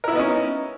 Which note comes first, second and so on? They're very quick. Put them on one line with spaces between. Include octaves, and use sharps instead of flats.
A#4 E4 B3 D#4 C#4